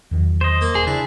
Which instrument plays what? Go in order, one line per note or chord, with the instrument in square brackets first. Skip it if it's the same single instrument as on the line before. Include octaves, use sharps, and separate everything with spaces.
[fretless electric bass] E2 D#3 F#3
[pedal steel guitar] C5 D#5
[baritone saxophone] A#3
[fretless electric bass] D#1 [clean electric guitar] G#4
[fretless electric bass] C#3 [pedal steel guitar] D4 [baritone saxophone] E4